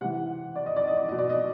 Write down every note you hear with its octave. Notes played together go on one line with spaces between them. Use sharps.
C3 E3 F#5
D5
D#5
D5
D#5
D5
B2 D#5
D5
D#5